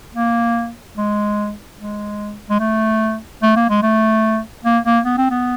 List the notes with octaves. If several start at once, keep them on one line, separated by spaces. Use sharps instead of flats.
A#3
G#3
G#3
G#3
A3
A3
A#3
G#3
A3
A#3
A#3
B3
C4
B3